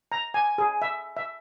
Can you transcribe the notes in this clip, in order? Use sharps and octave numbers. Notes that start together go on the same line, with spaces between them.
A#5
G#5
G#4
E5
E5